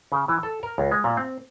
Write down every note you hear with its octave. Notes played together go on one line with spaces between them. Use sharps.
C#3
E3
A4
A#4
C#2
G#3
A#2
C4